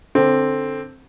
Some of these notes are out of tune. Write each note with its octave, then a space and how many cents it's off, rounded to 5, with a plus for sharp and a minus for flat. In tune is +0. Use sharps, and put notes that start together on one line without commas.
D3 +0 C4 +5